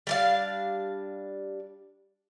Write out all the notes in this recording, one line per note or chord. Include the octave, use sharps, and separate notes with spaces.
G3 D4 F5